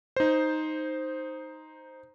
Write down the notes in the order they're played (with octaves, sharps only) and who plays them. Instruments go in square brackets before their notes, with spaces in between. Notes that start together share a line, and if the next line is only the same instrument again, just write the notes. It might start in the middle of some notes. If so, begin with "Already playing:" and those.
[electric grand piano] D#4 C5